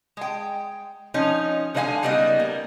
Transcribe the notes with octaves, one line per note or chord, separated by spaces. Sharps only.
G#3 G5
F3 C#4 D#4
D3 G#3 C5 D#5 F5 G#5
C#3 G3 B3 D#4 D#5
A#3